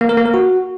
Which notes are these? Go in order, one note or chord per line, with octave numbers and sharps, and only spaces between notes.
A#3
A#4
A#3
A#4
F#4